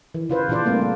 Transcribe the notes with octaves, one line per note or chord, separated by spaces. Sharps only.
E3
C#3 F4 B4 C5
A#2 E3 D4 F4 C5 D5
C#3 G3 A3 A#3 C4
A#3